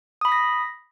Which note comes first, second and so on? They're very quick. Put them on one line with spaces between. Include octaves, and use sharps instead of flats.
D#6 B5 B6 A#6